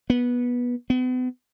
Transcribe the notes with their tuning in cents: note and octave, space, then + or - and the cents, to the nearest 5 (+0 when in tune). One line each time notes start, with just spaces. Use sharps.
B3 -15
B3 +40